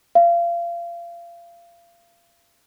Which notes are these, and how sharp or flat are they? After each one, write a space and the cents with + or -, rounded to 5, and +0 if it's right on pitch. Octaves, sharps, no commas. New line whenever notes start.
F5 -30